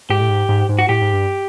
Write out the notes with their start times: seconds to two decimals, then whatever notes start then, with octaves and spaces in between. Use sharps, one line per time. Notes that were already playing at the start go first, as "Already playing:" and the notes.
0.10 G#2 G4
0.21 A2
0.29 G#2
0.49 G#2
0.69 G#2
0.79 F#4
0.89 A2 G4
1.01 G#2
1.13 G2